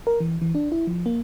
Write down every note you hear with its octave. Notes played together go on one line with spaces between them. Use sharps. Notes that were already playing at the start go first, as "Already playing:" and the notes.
A#4
E3
E3
D4
E4
F3
A#3